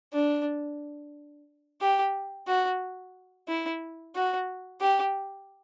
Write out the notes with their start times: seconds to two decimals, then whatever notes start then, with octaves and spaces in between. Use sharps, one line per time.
0.13 D4
1.81 G4
2.47 F#4
3.48 E4
4.15 F#4
4.81 G4